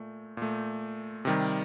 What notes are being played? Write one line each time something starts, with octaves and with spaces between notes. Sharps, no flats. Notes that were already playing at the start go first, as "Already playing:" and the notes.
Already playing: A#2 A3
A#2 A3
C3 D#3 G3